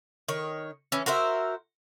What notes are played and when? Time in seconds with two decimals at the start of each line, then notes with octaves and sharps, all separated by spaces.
0.28 D#3 C#5
0.92 E3 C#4
1.06 F#4 A#4 C5 E5